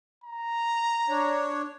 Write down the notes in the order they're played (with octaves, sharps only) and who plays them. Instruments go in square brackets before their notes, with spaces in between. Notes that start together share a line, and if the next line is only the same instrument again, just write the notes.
[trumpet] A#5
[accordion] D4 C#5